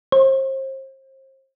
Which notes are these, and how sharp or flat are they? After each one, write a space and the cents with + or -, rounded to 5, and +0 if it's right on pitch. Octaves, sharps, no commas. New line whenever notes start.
C5 +35